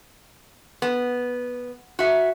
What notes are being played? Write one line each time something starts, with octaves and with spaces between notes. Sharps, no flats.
B3
F#4 E5